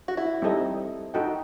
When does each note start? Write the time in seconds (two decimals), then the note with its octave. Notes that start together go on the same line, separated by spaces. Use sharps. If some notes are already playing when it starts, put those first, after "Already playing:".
0.08 F#4
0.17 E4
0.42 G3 C4 D#4 A4 D#5
1.14 D#4 F#4 A4 D#5 G5